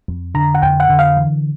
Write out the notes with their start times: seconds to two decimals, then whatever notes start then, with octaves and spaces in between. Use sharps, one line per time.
0.08 F2
0.35 D3 A#5
0.54 F#5
0.62 F2 G5
0.80 F#5
0.89 D3
0.99 F5
1.17 E3